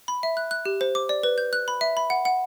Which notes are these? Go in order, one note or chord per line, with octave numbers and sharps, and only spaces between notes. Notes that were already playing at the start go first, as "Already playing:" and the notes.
B5
E5
F#6
F#6
G4
C5
D6
D5
B4
G6
F#6
B5
E5
B5
F#5
F#5